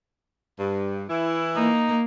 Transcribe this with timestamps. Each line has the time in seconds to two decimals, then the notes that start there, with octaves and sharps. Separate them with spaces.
0.59 G2
1.09 E3 E4
1.56 A#3 D#4